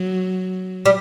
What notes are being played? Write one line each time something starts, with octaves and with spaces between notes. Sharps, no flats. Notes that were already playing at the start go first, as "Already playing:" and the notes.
Already playing: F#3
G3